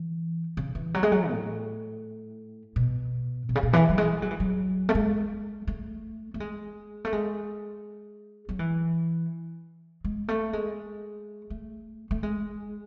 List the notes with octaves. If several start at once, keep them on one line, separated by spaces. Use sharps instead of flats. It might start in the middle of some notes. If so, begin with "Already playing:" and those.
Already playing: E3
C#3
E3
F#3
G#3
F#3
A2
B2
B2
C#3
B2
E3
F#3
G#3
F#3
E3
F#3
A3
G#3
A3
A3
G#3
A3
G#3
F#3
E3
G#3
A3
G#3
A3
A3
G#3